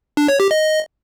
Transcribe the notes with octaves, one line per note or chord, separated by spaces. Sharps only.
D4
C#5
G4
D#5